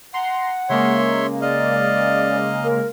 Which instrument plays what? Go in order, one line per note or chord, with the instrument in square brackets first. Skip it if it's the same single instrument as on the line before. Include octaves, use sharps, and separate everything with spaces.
[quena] F#5 [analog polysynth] A#5 C6
[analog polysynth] C#3 G#3 A#3 [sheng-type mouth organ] C#5 E5 C6
[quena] D5 [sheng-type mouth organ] D#5 F5
[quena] A#4